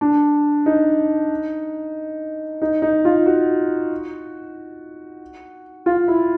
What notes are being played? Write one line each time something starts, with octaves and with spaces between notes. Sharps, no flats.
D4
D#4
D#4
D#4
F4
F#4
F4
E4